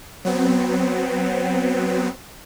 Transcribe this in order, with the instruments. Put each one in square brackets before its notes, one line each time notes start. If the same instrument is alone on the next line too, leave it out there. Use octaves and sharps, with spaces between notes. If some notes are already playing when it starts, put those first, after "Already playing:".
[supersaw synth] F#3 B3 C4